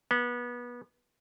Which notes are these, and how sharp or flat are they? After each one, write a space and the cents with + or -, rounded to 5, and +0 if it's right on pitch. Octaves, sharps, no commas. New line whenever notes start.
B3 -25